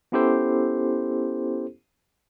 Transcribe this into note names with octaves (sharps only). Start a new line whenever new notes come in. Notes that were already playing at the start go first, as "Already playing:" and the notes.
B3 C#4 E4 G4 A4 C5